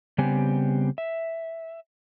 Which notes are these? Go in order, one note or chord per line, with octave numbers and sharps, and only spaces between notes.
C#3 G3 B3 C4 G4 G#5
E5